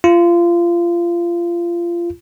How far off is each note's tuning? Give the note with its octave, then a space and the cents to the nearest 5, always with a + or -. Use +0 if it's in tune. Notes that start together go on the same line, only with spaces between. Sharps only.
F4 -25